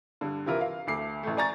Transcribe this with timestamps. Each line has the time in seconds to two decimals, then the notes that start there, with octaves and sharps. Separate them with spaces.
0.21 G2 D3
0.46 C3 E3 E4 F4 A#4
0.61 F5
0.87 D2 A3 D6 C7
1.23 A1 A3
1.37 D5 G#5 A#5 C#6 A6